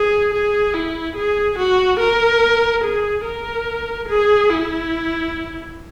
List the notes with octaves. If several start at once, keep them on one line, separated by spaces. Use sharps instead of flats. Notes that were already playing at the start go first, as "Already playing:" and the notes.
Already playing: G#4
G#4
E4
G#4
F#4
A#4
G#4
A#4
G#4
E4